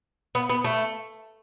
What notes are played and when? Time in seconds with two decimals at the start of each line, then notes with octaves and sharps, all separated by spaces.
0.35 B3
0.49 B3
0.64 A3